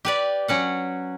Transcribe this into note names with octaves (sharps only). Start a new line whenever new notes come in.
G4 B4 D5
F#3 C#4 F#5